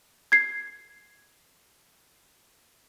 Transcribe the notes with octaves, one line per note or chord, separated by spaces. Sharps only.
G#6 C7